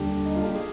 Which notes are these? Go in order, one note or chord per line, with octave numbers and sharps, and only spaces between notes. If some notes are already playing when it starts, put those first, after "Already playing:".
Already playing: D#2 D3 G3 D4 G4
D#4
F4
G4
G#4